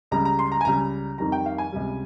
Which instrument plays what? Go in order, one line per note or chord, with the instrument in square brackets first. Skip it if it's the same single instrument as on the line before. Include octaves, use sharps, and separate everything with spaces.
[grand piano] C#2 C#3 G3 A#5
A#5
C6
A#5
G#5
C#2 C#3 G3 A#5
F2 D#3 G3 A#5
G5
F5
G#5
C#2 C3 G3